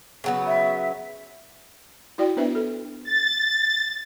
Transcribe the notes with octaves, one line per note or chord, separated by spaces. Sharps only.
C#3 F#3 B3
E5
E4 F#4 D5 G5
B3 D4 B4 C5 E5
A4
A6